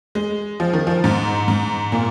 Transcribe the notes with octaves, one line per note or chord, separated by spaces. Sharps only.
G#3
F3
D#3
F3
G#2
G#2
A#2